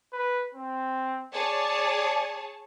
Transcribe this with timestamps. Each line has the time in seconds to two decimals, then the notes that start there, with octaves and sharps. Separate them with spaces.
0.13 B4
0.55 C4
1.34 G#4 C#5 D5 A5